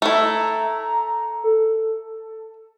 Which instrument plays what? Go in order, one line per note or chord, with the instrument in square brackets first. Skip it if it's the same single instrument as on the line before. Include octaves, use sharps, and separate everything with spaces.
[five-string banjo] A3 E4 [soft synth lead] A#5
[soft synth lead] A4